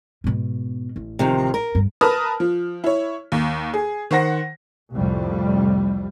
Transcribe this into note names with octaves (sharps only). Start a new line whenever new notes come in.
G#2 B2
A1
C3 D#3 F3
A#4
G2
A#4 B4 A5 D#6 F6
F3
E4 C#5
D#2
G#4
D#3 C5 F#5 A#6
C2 F2 A2 G3